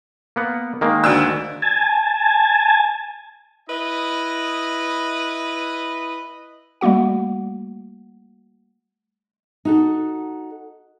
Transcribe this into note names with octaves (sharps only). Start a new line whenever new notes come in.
A#3 B3 F#5
D#3 G#3 A#3
D2 D4 E6
G#5 A5
E4 B4 D#5
G3 A3 A#3 F#4 F#5
D#4 F#4 A4